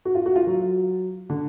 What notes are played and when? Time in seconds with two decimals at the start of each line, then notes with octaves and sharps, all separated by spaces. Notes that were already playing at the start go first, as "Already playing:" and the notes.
0.05 F#4
0.15 F4
0.26 F#4
0.36 F4
0.47 F#3
1.30 D3